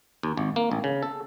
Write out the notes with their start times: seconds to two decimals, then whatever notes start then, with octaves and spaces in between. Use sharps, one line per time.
0.23 D#2
0.37 G#1
0.56 A#3
0.71 A1
0.84 C#3
1.03 A4